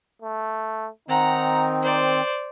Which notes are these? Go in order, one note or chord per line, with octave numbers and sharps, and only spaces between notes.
A3
D#3 C4 D#4 F#5 A#5
C5 D5